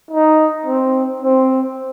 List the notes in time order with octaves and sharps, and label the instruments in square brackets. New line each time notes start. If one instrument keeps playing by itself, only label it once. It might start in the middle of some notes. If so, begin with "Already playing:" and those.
[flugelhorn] D#4
C4
C4